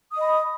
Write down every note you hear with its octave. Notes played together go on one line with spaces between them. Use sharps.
D#5 B5 D#6